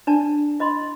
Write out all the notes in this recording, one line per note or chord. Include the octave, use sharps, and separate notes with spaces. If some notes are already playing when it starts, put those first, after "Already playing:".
D4 D5 A5
E4 D#5 B5 C6